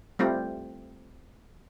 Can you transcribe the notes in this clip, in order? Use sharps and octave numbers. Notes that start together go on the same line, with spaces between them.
G3 A3 C4 F4